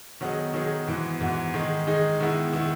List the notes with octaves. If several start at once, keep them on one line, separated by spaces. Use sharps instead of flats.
D#3 F#3 B3 D#4 G#4
D#3 F#3 B3 D#4 G#4
G#2 E3 B3 F#4
G#2 E3 B3 F#4
D#3 G#3 D#4 G#4
D#3 G#3 D#4 G#4
D#3 G#3 B3 E4
D#3 G#3 B3 E4